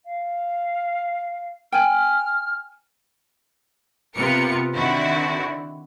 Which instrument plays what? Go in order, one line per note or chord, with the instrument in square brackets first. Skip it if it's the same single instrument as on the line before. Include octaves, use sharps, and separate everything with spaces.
[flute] F5
[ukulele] G5 G#5 [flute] F6
[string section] C3 B3 F4 A#4 C#7
D3 D#3 C4 E4 F#4